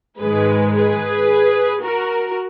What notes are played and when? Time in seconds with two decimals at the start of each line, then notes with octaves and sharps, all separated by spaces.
0.20 G#2 D#3 G#3 G#4 B4
0.75 G#4 B4
1.83 F#4 A#4